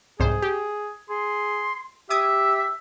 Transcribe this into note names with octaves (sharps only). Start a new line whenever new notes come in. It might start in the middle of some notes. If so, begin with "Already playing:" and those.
C2 G#2 G#4 C5
G4
G#4 C6
G4 E5 D6 D#6 G#6